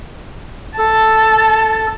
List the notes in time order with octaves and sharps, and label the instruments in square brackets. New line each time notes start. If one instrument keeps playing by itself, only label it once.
[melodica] A4 [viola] A5